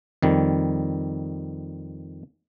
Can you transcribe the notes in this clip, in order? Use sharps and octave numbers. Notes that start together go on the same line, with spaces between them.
F2 D#3 G3